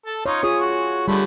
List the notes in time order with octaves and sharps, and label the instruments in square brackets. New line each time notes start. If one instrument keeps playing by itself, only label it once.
[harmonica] A4 A5
[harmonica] D#4 F4 [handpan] C#5
[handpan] F4 G#4 C#5 [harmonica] D#6
[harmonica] F#4
[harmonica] D3 A3 B5 [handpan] G3